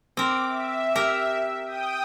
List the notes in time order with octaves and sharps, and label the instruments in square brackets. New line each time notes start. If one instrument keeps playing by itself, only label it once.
[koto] C4 A#4 [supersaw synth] D6
[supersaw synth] E5
[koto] G4 A#4
[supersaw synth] G5 D#6